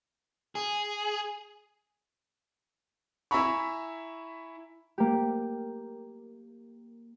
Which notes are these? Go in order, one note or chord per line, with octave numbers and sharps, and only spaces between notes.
G#4
E4 E5 G#5 A#5 B5 C#6
A#3 G4